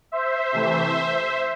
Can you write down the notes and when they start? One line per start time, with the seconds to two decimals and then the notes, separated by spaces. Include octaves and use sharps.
0.12 C5 E5
0.52 C3 E3 A3